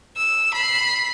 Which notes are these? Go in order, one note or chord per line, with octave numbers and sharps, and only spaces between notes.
E6
B5 C7